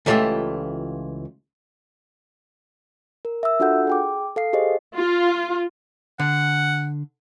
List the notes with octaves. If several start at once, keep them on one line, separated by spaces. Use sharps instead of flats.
C#2 E3 A3 F4 G4 E5
A#4
E5 E6
D4 F4 F#4 A4 F#5 G6
G#4 G5 D6
A4 F5 C7
G4 G#4 C5 D#5
F4
D3 F#5